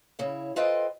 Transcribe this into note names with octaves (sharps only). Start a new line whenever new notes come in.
C#3 E4 C#5
F4 A4 B4 C5 D#5 G5